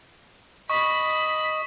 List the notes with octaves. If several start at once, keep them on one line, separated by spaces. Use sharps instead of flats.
D#5 B5 C#6 B6